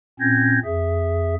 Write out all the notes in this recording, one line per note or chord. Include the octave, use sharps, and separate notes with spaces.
A#2 C4 C#4 G6 G#6 A#6
F2 G#4 E5